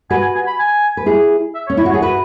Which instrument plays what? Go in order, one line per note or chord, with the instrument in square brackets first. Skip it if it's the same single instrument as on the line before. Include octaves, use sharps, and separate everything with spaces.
[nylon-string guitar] F#4 B4 [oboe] G#5
[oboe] G#5
G#5
B5
G#5
[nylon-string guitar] B4
E4 G#4
[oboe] E5
C#5
[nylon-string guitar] C#4
[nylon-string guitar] E4 [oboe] C#5
[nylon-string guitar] F#4
[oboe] C#5
[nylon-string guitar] G#4
[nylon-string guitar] F#4 B4 [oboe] B5